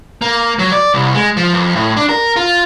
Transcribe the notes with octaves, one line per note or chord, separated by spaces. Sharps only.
A#3
F#3
D5
C2
G#3
F3
F2
A2
D4
A#4
F4